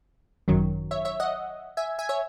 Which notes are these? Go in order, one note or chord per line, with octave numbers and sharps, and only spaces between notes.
G#1 F#2 D#3 F#3
C#5 E5
C#5 E5
D#5 F#5
E5 G#5
E5 G#5
C#5 E5